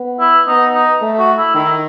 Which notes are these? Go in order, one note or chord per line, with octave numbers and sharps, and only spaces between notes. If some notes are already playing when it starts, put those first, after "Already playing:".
Already playing: B3
E4
B3 D#4
D#4
A3
F#4
E4
D#3 E4